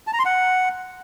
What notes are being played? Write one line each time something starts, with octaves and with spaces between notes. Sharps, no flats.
A5
A#5
C6
F#5